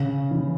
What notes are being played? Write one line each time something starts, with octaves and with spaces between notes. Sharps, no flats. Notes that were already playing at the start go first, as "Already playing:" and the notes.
Already playing: C#3
E3